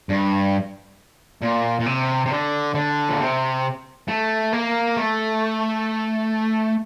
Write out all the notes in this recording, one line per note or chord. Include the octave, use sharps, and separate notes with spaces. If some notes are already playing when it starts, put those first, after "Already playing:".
G2
A#2
A#2
C3
C3
D3
D3
A#2
C3
A3
A#3
A3